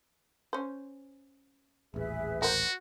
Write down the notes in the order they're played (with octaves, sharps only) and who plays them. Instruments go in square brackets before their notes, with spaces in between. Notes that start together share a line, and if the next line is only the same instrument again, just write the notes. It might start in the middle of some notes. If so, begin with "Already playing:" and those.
[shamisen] C#4 C5
[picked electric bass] D#1 A1 [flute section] G#4 B4 E5
[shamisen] F#3 A#4 C5 [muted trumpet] F#4